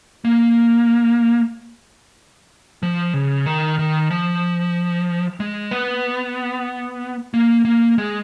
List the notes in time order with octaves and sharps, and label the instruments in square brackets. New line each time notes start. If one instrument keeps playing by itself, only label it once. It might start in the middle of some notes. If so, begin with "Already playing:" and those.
[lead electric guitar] A#3
F3
C#3
D#3
D#3
F3
G#3
B3
A#3
A#3
G#3